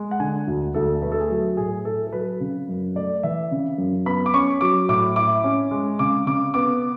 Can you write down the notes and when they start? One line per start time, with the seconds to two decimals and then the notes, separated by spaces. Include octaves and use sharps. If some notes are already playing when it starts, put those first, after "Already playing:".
Already playing: G#3
0.11 F#5
0.20 D3 G#5
0.47 D2
0.74 D2 A4
1.02 A3 B4
1.12 A4
1.20 G#4
1.30 F#3 A4
1.57 A2 G#4
1.85 E4 A4
2.07 A4
2.13 F#3 B4
2.40 C#3
2.69 F#2
2.95 A3 D5
3.23 E3 E5
3.51 C#3
3.78 F#2
4.06 B3 B5
4.26 D6
4.34 C#4 C#6
4.61 F#3 D6
4.89 A2 D6
5.16 E4 D6
5.44 C#4
5.71 G#3
5.99 C#3 D6
6.27 C#3 D6
6.54 B3 D6